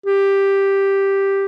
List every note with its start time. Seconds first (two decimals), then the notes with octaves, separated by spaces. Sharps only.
0.07 G4